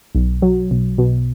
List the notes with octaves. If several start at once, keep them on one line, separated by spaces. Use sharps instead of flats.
B1
F#3
B1
B2